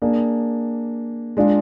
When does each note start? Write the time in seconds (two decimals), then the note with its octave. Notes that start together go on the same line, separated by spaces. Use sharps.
0.02 A#3 D4 G#4
1.37 G#3 D4 F4